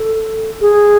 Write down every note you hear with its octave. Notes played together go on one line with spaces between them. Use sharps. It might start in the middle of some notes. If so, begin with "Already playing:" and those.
Already playing: A4
G#4